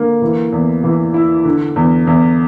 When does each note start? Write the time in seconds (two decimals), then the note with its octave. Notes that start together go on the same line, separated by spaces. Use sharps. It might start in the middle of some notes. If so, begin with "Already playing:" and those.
Already playing: D3 A#3
0.22 E3
0.53 E2
0.84 E3
1.14 E4
1.45 D3
1.76 E2
2.07 E2